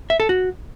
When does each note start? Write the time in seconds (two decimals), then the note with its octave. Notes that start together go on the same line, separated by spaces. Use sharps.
0.10 E5
0.20 A4
0.29 F#4